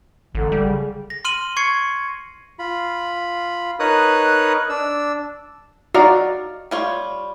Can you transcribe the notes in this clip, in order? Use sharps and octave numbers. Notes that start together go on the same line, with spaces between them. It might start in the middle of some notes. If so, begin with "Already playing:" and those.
A1 D3
G3
C#3
A#6
C6 F6 D#7 F#7
C#6 G#6 C7 C#7
F4 B5
D#4 A#4 B4 C#5 D#6 F#6
D4 E6
D#4 F#4 D5 D#5 F5
G3 F4 C#5